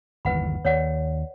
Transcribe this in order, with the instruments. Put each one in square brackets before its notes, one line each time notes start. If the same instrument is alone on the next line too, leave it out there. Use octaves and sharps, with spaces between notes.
[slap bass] G1 D#2 E3 [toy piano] B4 F#5 B5
[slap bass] D#2 [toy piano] C#5 D5 F#5